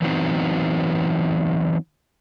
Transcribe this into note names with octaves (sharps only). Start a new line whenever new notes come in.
E3 F#3 B3 C4 D#4 C5